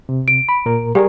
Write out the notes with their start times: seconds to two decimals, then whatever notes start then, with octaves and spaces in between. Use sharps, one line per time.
0.09 C3
0.28 D7
0.49 B5
0.66 A#2 A#4
0.95 G3 G4 G#4 A#4 D5